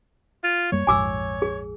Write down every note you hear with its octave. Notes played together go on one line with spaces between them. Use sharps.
F4
F#2 G3 A#3 C#5
A#1 F2 G#2 G#5 D6 E6
G#4